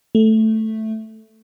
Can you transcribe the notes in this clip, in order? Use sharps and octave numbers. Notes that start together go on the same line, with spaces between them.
A3